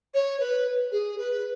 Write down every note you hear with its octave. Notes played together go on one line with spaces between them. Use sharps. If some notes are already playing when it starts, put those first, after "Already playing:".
C#5
B4
G#4
B4